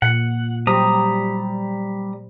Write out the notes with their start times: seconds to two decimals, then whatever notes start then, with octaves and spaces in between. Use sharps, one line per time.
0.02 A#2 F#5
0.67 F#3 G3 G4 C5 A#5 D#6